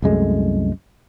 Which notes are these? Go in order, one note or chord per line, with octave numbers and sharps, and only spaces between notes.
C2 F#2 G#3 A3